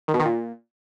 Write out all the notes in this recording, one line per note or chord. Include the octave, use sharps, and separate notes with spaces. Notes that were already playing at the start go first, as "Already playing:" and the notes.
D#3
B2
D#3
A#2